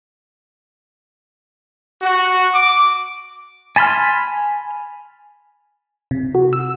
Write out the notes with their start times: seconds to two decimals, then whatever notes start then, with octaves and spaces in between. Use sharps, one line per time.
2.01 F#4
2.53 D6
3.76 G#5 A5 B5 C6 F6
6.11 C3
6.35 F#4
6.53 E6